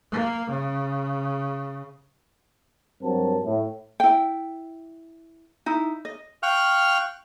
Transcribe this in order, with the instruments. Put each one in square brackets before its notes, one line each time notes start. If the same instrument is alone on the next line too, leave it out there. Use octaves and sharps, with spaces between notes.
[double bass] A#3
C#3
[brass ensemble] G2 F#3 C4 A#4 A5
A2
[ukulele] E4 G5
D#4 E4
D#5
[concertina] F5 G5 C#6 F6 F#6